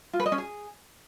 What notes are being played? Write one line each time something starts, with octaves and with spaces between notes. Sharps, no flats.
F4
B4
D#5
C#4
G#4